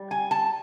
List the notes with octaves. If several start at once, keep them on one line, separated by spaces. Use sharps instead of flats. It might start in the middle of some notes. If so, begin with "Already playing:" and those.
Already playing: G3
G#5
A5